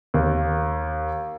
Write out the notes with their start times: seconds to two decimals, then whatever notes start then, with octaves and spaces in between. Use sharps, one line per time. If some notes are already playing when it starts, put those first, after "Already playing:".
0.14 D#2